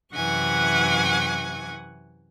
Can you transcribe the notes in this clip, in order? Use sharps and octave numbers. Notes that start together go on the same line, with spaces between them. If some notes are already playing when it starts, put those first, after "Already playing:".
F#2 C3 E3 F#5 G#5 C#6